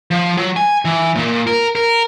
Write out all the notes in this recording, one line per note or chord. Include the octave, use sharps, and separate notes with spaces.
F3
F#3
G#5
E3
A#2
A#4
A#4